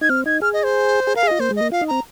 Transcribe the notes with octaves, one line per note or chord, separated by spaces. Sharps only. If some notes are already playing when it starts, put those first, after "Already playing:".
D#4 G#6
C4 F6
D#4 G#6
G#4 F6
D#5
C5
G#4
A#4 F5
G#4
F4 D#5
A#3 C5
G#3
A#3 D#5
F4 F5
D#4
C4 A#5